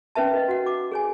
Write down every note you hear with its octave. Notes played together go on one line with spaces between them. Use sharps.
C#4 D#4 B4 E5 A5
B4 D#5
F#4 F#5
D6
G#4 C#5 G#5